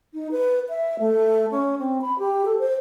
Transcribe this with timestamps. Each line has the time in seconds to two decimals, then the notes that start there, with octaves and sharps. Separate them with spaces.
0.14 D#4
0.32 B4
0.69 E5
0.99 A3
1.51 C#4
1.79 C4
2.01 B5
2.19 G4
2.45 A4
2.59 C5